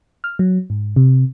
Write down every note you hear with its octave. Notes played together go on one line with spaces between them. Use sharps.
F6
F#3
G#2
C3